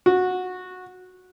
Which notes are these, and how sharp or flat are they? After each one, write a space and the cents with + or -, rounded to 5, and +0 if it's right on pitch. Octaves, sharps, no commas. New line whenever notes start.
F#4 -15